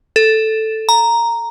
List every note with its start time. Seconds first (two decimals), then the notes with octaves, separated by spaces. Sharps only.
0.16 A4
0.89 A#5